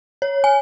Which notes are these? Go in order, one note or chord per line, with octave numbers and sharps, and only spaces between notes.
C#5
G#5